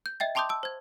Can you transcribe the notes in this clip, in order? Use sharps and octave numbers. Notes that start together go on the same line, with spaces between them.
G6
D#5 E5 G5 A6
G5 A5 C6 D6 D#6 G6
A5 E6
C5 G#6